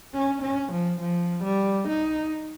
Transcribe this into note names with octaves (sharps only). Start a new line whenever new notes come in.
C#4
C#4
F3
F3
G3
D#4